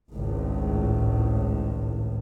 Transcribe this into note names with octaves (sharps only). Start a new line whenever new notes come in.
G#1 C#2 A2